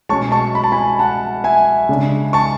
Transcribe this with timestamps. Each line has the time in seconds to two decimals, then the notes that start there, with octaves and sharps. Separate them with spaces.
0.09 B2 G#3 C#4 A5 C#6
0.32 A5 C#6
0.55 B5
0.64 A5
0.72 G#5 B5
0.99 F#5 A5
1.44 E5 G#5
1.89 C#3 G#3 D4
2.33 A5 C#6